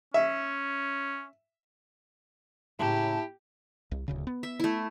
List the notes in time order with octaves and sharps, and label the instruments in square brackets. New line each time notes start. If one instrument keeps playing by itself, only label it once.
[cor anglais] C#4 [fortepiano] E5
[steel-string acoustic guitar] A2 C#3 A#3 [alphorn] E4 [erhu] G4 [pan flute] A5
[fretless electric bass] C2
D1 D2 C#3
B3
[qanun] E5
A3 E4